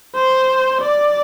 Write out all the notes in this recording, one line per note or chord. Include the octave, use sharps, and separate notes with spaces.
C5
D5